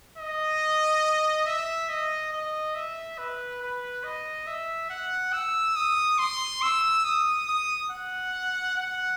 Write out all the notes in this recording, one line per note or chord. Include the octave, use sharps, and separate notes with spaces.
D#5
E5
D#5
D#5
E5
B4
B4
D#5
E5
F#5
E6
D#6
C6
E6
D#6
D#6
F#5
F#5